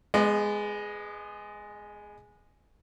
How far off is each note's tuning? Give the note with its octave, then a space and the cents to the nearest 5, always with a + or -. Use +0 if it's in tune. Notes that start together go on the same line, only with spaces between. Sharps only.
G#3 +0 B3 +10 D#5 -40